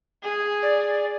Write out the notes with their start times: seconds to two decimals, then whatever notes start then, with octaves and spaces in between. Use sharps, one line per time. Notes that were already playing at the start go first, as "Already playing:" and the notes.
0.23 G#4
0.63 D5